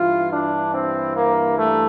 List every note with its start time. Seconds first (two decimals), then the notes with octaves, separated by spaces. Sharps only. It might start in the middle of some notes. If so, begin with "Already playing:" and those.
Already playing: G2 E3 F4
0.31 D4
0.73 C4
1.15 A#3
1.57 A3